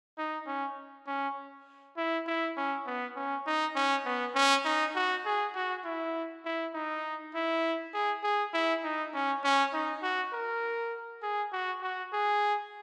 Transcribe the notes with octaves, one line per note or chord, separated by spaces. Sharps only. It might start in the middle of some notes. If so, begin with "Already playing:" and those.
D#4
C#4
C#4
E4
E4
C#4
B3
C#4
D#4
C#4
B3
C#4
D#4
F#4
G#4
F#4
E4
E4
D#4
E4
G#4
G#4
E4
D#4
C#4
C#4
D#4
F#4
A#4
G#4
F#4
F#4
G#4